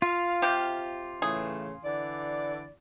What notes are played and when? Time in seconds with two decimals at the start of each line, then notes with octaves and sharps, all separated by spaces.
0.02 F4 F5
0.42 C3 G4
1.22 A2 C#3 E3 G#4
1.84 D3 E3 D5